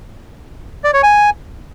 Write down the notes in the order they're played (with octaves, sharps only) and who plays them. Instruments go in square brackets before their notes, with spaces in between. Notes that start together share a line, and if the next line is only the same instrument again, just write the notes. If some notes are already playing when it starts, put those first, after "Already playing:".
[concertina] D5
C#5
G#5